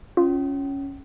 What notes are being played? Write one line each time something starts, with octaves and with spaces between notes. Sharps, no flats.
C#4 F4